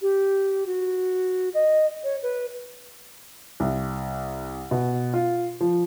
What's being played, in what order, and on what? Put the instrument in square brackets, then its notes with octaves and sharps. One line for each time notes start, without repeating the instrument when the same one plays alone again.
[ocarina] G4
F#4
D#5
C#5
B4
[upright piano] C2
B2
F4
F3